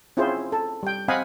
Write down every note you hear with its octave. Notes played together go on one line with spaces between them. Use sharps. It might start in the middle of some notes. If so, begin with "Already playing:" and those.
C4 C#4 E4 F4 G#4 C5
A4
G3 G5
C4 D#5 F5 F#5 G#5 B5